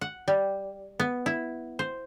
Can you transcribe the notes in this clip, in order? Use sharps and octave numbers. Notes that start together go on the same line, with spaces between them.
F#5
G3
B3
E4
C5